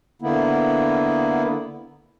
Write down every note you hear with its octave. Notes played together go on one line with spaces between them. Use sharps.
D3 A#3 B3 E4